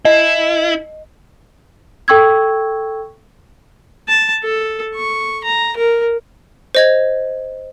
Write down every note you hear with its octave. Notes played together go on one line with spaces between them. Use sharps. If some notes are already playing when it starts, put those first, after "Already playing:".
E4 D#5
A4 G5 C#6 E6 G#6
A5
A4
C#6
A#5
A#4
C5 D#5 G#6